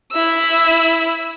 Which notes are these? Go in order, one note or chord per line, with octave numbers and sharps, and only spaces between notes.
E4 E6